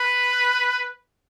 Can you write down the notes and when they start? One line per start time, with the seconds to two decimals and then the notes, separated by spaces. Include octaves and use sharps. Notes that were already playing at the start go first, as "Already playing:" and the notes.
Already playing: B4